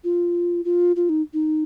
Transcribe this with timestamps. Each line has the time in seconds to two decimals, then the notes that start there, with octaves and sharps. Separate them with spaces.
0.04 F4
0.65 F4
0.96 F4
1.09 D#4
1.33 D#4